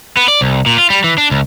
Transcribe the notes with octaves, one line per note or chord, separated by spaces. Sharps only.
B3
D5
C2
A#2
F4
G3
E3
D4
C#2